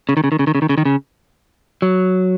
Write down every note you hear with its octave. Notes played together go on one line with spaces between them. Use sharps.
C#3
D#3
C#3
D#3
C#3
D#3
C#3
D#3
C#3
D#3
C#3
F#3